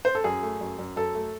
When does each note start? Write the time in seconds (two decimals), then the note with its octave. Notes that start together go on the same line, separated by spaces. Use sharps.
0.05 C5
0.15 A4
0.24 F#2 G#4
0.43 A3
0.61 F#2
0.79 F#2
0.96 F#2 A4
1.15 A3